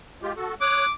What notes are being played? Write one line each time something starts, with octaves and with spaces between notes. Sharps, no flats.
G#3 F4 G4
F#4 A4
C#5 D6 D#6 F#6